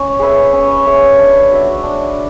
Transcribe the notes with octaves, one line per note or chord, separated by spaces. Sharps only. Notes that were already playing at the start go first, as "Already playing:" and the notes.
Already playing: C#4
G#4 B4 E5
C#4
G#4 B4 E5
D4
F#4 C#5 E5
D4